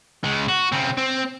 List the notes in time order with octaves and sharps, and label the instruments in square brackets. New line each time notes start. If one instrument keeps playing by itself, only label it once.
[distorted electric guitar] C#3 G#3
F#4
C#3 C4
C4